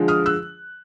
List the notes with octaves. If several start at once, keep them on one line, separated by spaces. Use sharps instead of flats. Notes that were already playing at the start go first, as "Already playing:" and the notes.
Already playing: D3 F3 G#3
D#6 F6
E6 F#6